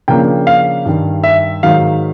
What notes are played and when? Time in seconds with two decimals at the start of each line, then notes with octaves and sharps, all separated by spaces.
0.08 C#3 F3 A#3 D4 G5
0.47 F5
0.85 G2 D#3 G3
1.24 E5
1.63 G#2 D#3 F#3 F5